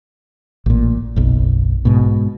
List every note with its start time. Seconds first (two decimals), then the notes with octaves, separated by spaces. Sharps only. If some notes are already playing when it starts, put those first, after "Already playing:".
0.66 A1 A#2
1.16 F#1 B1
1.85 G#2 B2